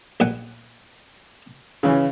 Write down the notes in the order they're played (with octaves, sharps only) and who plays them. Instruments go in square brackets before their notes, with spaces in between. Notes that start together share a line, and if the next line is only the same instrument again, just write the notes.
[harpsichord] A#1 A#2 F#5
[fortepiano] C#3 E3 C#4